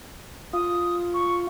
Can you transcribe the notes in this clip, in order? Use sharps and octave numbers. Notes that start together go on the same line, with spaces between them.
F4 D#6
C#6